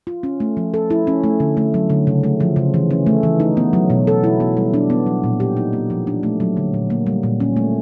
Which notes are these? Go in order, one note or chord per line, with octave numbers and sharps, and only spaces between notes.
F4
C#4
A3
F3
A4
E4
C#4
A3
D3
A3
F#3
D3
C#3
A3
F3
C#3
E3
C#4
A3
E3
D#4
B3
F#3
B2
A4
E4
B3
G3
D4
B3
F#3
A#2
G4
D#4
A#3
F3
D4
A3
F#3
D3
A#2
A#3
G3
A#2
C#4
A3